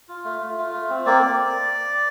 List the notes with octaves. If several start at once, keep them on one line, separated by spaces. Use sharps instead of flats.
F4
A3
A3
F4
A3
C4
A#3 D5